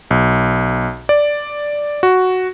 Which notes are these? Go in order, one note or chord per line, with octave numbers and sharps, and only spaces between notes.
B1
D5
F#4